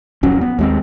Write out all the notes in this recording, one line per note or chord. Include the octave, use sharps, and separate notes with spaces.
D#1 F2 F#3 C#4
B3
D#2 G#3 C4